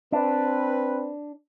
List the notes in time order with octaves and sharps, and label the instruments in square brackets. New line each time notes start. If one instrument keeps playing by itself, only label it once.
[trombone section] C4 B4 [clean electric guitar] D4